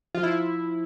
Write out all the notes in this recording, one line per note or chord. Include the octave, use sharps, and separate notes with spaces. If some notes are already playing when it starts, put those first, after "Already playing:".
F3 F4
E4